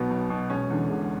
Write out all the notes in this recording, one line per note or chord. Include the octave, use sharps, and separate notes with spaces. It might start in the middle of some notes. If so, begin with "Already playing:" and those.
Already playing: B1 B2 B3
B1
B2
E1 C#4
E2 D3
E1